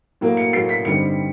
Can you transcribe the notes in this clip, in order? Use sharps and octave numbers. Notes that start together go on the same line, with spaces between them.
A2 F#3 A#3
C#7
A2 F#3 A#3 C7
B6
G2 D3 G3 C4 D#4 C#7